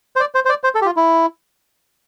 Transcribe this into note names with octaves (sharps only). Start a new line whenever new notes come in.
C5
D5
C5
C5
D5
C5
A4
G4
F4
E4